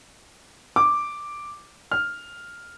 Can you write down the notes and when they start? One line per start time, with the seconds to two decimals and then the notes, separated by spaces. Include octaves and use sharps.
0.76 D6
1.91 F6